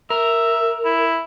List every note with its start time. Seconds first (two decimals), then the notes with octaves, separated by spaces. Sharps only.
0.10 A#4 E5
0.85 E4